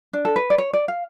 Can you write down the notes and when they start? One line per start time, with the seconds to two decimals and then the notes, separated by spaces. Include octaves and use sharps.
0.13 D4
0.25 A4
0.36 B4
0.50 D5
0.58 C#5
0.73 D5
0.88 F5